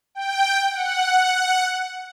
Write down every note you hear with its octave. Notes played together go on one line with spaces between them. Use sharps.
G5
F#5